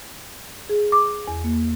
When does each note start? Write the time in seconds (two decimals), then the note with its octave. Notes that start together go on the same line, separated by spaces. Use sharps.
0.69 G#4
0.92 D6
1.28 E2
1.44 A#3